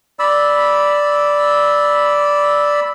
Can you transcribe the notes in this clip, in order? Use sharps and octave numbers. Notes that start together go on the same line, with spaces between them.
D5 B5 E6